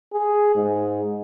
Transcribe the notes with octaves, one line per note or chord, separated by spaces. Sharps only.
G#4
G#2